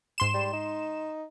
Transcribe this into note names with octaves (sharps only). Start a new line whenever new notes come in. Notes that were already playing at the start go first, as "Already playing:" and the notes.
G#2 C6 E7
G3
D#4